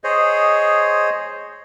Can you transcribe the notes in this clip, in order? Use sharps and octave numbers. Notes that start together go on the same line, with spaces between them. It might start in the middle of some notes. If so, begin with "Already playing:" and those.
G#4 C5 C#5 D#5